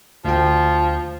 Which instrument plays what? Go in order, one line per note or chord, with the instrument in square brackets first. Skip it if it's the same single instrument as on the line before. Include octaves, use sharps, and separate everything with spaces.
[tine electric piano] D2 G5 [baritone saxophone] F3